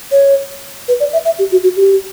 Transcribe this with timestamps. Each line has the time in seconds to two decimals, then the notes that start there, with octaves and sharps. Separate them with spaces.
0.11 C#5
0.88 B4
1.00 D5
1.13 E5
1.25 E5
1.39 G4
1.52 F#4
1.64 F#4
1.77 G4